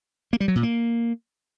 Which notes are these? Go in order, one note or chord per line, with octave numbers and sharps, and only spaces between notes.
A#3
G3
F#3
A#2
A#3